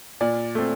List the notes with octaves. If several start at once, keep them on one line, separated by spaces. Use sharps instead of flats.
A#2 D5
A3 C4